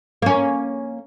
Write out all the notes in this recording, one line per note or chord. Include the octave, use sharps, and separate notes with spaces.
A#3 C#4